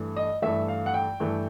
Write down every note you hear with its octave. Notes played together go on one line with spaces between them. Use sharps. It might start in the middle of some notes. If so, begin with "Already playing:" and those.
Already playing: G2 E3 A3
D#5
G2 E3 A3 E5
F5
F#5
G5
G2 E3 A3